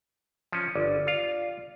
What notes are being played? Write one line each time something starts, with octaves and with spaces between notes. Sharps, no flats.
F3 C#4
G1 D5
F4 F5